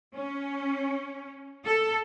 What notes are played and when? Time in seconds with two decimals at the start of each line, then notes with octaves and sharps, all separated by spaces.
0.15 C#4
1.66 A4